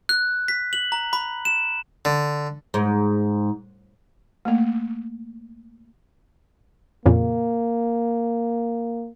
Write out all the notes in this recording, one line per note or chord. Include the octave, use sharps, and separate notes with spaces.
F#6
B6
F#7
A#5
B5
E7
D3
G#2
A3 A#3
F2 A#2 C#3 A#3